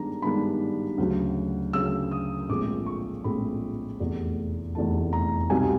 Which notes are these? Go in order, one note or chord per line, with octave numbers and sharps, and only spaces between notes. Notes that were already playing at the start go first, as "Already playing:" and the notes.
Already playing: G2 D#3 G#3 B3 D4 A#5
G2 D#3 G#3 B3 D4 B5
D2 C#3 F#3
D2 C#3 F#3 E6
D#6
A#1 A2 F3 G#3 C4 D6
C#6
A#1 A2 F3 G#3 C4 B5
F1 E2 C3 E3 A3
F1 E2 C3 E3 A3 A5
A#5
C2 B2 G3 C4 D#4 G#5